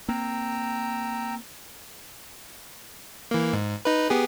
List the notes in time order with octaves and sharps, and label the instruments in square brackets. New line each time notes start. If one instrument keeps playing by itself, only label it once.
[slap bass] A#3 C4 [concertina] G5 A#5 E6
[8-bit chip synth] E3 A#3
G#2
D#4 B4
B3 G4 G#4